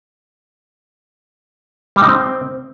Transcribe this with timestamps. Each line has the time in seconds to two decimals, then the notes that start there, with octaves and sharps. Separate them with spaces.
1.96 G3
2.02 D#4
2.08 C4